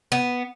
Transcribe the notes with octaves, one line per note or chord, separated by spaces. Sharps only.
B3